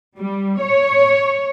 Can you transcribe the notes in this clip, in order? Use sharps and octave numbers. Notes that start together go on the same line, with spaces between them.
G3
C#5